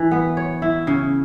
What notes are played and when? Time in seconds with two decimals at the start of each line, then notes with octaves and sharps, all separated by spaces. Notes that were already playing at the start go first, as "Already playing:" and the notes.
Already playing: E3
0.11 B3
0.37 C#5
0.62 E4
0.87 C#3